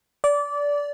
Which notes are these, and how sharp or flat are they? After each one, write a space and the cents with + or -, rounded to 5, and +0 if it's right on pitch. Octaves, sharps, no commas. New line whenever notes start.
D5 -20